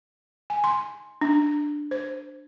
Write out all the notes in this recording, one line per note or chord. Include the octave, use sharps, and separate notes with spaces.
G#5
C6
D4
C5